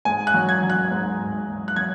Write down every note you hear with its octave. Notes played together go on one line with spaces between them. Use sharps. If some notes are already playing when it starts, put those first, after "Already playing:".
G#2 G#5
F#6
F#3
G#6
F#3
F#6
G#2
G#2
F#3
F#6
F#3 G#6